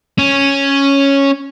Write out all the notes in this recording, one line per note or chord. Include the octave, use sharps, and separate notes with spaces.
C#4